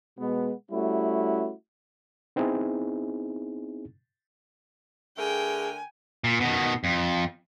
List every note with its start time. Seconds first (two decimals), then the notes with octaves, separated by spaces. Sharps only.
0.19 B2 G#3 B3
0.71 G3 A3 C#4 E4 F#4
2.36 B3 C4 D#4 E4 G#4
5.18 D3 A3 G#4 A#4 G5 G#5
6.24 A#2
6.40 B2 D#3
6.84 F2